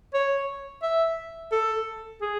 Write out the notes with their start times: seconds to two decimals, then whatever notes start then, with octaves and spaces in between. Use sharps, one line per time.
0.14 C#5
0.83 E5
1.52 A4
2.21 G#4